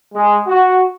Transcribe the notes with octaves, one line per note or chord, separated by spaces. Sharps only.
G#3
F#4